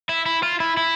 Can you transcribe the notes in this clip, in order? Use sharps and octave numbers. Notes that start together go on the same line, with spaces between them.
E4
E4
F4
E4
E4